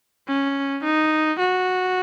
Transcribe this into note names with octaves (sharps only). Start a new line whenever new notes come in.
C#4
D#4
F#4